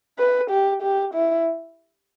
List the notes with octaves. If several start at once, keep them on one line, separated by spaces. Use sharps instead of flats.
B4
G4
G4
E4